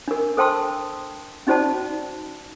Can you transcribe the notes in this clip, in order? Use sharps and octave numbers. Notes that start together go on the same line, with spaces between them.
D4 A#4
A4 C5 G5 A5 C6 E6
C#4 D#4 F#4 C5 D5 A5